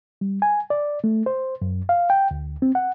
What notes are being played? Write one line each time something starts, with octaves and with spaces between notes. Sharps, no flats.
G3
G#5
D5
A3
C5
F#2
F5
G5
D2
C4
F#5